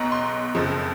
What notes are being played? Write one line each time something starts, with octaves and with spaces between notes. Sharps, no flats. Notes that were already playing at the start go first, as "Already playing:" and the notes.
Already playing: B1 B2 A#5
C6
F#1 F2 C#3 F3